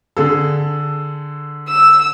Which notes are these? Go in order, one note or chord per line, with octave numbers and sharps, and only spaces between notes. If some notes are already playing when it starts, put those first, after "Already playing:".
D3 G#4 A4
E6